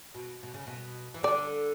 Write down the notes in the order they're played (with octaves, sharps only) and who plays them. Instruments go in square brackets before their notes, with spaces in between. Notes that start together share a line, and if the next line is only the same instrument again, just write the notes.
[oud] B2
B2
C#3
B2
E3
[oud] D3 [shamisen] D5